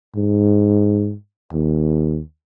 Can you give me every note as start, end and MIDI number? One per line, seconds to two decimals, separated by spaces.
0.16 1.15 44
1.53 2.21 39